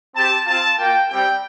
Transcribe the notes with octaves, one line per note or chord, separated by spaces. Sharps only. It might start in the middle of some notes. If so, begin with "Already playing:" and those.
C4 G4 A5
C4 F4 A5
A#3 F4 G5
G3 C4 G4 G5